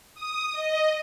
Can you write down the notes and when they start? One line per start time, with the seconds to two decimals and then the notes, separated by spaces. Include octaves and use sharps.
0.15 D#6
0.52 D#5